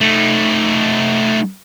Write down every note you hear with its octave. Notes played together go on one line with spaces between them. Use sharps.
A3 D#4